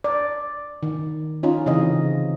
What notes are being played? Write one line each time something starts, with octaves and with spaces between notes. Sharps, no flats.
D5
D#3
C#4 D#4 F4
C#3 E3 C4 D#5